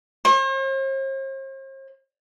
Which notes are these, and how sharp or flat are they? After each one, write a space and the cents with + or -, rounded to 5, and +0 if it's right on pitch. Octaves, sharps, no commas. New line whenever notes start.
C5 +45